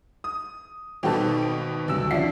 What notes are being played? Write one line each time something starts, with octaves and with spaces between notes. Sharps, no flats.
D#6
G#1 B2 D#3 G3 F#4 A4 G5 A5
D7
D2 G2 C3 F#3 E6
D#2 F3 C#4 D5 E5 F#5 C7